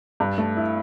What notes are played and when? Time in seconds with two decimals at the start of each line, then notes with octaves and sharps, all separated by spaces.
0.20 G2
0.38 A3
0.57 E4